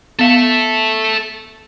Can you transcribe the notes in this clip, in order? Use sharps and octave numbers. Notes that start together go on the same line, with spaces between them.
B3 A4 E5 F5